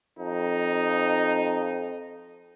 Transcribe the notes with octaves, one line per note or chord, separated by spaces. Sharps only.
F2 D#4